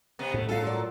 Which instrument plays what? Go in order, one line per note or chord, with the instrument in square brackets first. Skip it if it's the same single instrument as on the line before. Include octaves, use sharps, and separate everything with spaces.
[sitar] C3 B3
[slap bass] A2 [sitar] A3
[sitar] F#3 A4 [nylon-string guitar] F4 F#4 F5
[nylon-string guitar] F4 A#4 D5